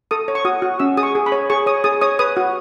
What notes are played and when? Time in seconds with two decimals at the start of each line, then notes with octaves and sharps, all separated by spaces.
0.11 A4 D#6
0.28 C#5
0.35 C#6
0.45 F#4 D#6
0.62 F#4
0.79 C#4 E6
0.97 G#4 D#6
1.03 C#6
1.15 G#4
1.26 B5
1.32 C#5
1.50 G#4 C#6
1.66 C#5 D#6
1.84 G#4 D#6
2.01 C#5 D#6
2.19 B4 D#6
2.37 F#4